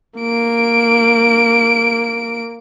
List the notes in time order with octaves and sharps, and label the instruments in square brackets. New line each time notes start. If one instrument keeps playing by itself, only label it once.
[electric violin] A#3 D7